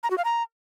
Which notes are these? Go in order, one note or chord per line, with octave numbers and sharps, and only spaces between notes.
A#5
F#4
F5
A#5